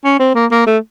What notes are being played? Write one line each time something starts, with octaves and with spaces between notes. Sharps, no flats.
C#4
C4
A#3
A#3
A3